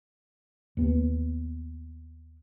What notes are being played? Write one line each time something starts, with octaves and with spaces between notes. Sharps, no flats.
D#2 B3